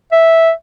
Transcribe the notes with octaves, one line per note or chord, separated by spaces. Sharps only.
E5